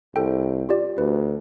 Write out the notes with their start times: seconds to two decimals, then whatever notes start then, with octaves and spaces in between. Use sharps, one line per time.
0.16 C2 A4 G5
0.69 F4 G4 D5
0.98 D2 B4